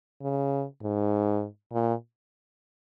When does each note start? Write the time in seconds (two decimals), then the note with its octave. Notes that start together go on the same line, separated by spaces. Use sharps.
0.22 C#3
0.82 G#2
1.73 A#2